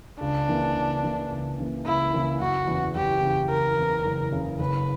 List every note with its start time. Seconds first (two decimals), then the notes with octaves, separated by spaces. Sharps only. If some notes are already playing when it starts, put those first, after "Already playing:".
0.20 C#2 D4
0.48 C#3 E3 A#3
0.75 C#2
1.03 C#3 E3 A#3
1.30 C#2
1.58 C#3 E3 A#3
1.86 C#2 E4
2.13 C#3 E3 A#3
2.40 F#1 F#4
2.67 E2 C#3
2.95 F#1 G4
3.22 E2 C#3
3.49 F#1 A#4
3.77 E2 C#3
4.04 F#1
4.32 E2 C#3
4.59 F#1 B4